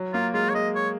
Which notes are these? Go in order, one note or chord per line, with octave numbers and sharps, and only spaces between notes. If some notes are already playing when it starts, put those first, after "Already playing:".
Already playing: F#3
A#3 F4
G#3 F4
C#5
G#3 D#5
C#5